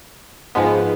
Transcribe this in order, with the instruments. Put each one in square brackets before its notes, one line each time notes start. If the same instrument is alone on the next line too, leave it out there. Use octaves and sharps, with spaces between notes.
[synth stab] G#2 F3 G#3 B3